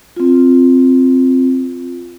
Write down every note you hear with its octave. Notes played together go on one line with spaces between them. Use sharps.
C4 F4